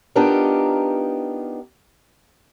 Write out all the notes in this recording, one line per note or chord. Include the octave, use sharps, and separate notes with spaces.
B3 D4 D#4 F4 G4 A#4